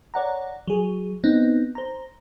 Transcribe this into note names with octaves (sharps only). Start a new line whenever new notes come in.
C#5 D5 F#5 A#5
F#3 G#4
B3 C4 D#4
C5 A#5